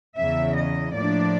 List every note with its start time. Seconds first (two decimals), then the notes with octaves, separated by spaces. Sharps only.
0.18 E2 C#3 E3 E5
0.56 D#5
0.94 A2 F3 A#3 D4 D5